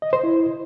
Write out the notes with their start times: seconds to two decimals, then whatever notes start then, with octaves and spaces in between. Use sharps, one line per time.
0.02 D#5
0.13 C5
0.23 E4